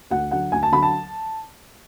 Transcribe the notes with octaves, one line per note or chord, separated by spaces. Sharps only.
D2 F#5
D3 F#3 F#5
D2 G#5
A5
D3 F#3 B5
A5